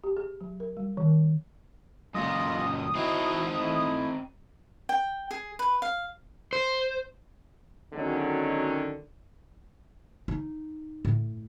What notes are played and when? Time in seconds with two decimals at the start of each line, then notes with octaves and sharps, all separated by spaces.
0.04 G4
0.17 G#4
0.41 F#3
0.60 A#4
0.77 G3
0.97 D#3
2.15 F#2 A#2 F4 D#5 D#6
2.95 C4 D#4 E4 F#4
3.60 A3 E4
4.89 G5
5.31 G#4
5.59 B4
5.82 F5
6.53 C5
7.93 B2 D3 D#3 F#3 G#3 C#4
10.28 D#4
11.05 A2